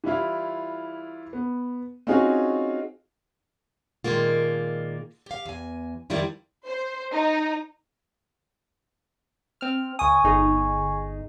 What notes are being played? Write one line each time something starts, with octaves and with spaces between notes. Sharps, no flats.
E3 G3 E4 F4
B3
C4 C#4 D#4 F4 F#4 G#4
A#2 D#3 G#3 A#3 F4
G4 F5
E2 G#5
F2 D#3 G3 B3 E4 F4
C5
D#4
C4 F6
C#2 G#5 C#6 D#6
G1 D#4 G#4